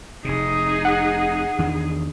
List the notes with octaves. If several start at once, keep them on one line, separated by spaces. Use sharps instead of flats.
F1 C3 D#4 G#4
F#5
E2 D#3 D4